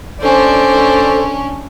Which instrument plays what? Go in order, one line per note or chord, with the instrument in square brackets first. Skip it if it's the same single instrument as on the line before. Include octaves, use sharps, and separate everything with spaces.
[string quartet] C#4 D4 [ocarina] A4 [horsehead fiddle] C5 D5